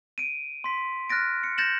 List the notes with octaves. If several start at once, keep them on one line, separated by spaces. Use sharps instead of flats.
D7 D#7
C6 B6
F6 F#6 A6 A#6 D7
C#7
G6 A6 A#6 C#7 E7 F#7